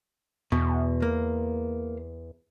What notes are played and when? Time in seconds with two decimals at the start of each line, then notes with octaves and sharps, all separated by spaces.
0.52 E2 B2
1.02 A#3